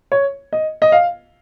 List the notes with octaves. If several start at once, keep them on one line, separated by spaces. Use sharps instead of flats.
C#5
D#5
D#5
F5